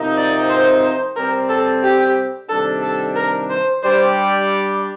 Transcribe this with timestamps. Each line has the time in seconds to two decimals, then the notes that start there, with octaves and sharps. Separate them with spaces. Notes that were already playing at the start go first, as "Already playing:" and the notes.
Already playing: C3 F3 C4 D#4 A#4
0.17 D5
0.49 C5
0.83 C5
1.16 C3 G3 C4 A#4
1.49 A4
1.84 G4
2.49 C3 D#3 G3 D4 A4
2.82 A4
3.15 A#4
3.50 C5
3.83 G3 D4 G4 C5 D5